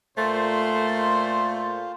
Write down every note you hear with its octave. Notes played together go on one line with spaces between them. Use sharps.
A#2 A3 F4 C5